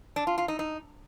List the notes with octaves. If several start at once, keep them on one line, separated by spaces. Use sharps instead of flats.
D4
F4
F4
D#4
D#4